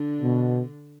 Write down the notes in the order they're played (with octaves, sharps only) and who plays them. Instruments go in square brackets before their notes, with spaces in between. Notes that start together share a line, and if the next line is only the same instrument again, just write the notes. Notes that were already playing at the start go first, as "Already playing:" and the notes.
Already playing: [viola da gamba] D3 D4
[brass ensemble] B2